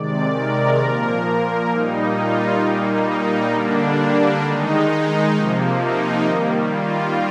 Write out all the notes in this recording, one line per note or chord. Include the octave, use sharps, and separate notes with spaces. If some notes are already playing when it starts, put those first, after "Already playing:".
Already playing: C3 D#3 G#3 D5
A#4
A#2 F3 A#3
A#2 G3 A#3 D#4
F4
A#2 G3 A#3 D#4
D#4
D3 G3 A#3 D4
D4
D#3 G#3 D#4
C3 F3 A#3
D#4
D#3 G3 A#3
F4